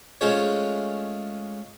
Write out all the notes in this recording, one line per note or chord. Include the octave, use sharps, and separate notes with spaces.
G#3 A3 C#4 F4 C5 C#5